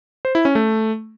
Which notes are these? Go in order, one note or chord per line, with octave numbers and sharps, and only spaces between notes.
C5
E4
C#4
A3